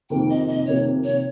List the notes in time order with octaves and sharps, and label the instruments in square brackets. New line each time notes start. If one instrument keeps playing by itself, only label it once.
[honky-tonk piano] F2 C3 D#3 A#3 [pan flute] G5
[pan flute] D#5
D#5
[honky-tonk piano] F2 C3 D#3 A#3 [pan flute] C#5
[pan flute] C#5